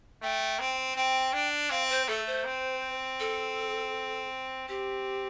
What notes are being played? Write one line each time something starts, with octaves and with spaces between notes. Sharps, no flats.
A3 G5
C4
C4 G5
D4
C4 F5
C5
A3 A4
C5
C4
A4
C4 G4